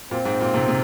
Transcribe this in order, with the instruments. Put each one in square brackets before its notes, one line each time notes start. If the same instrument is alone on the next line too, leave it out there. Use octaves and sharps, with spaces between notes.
[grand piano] A#2 [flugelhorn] C4
[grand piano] G#2
A#2
G#2 C3
C3